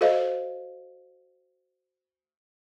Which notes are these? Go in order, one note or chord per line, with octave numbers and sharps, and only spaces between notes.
F#4 A4 C5 D#5 F5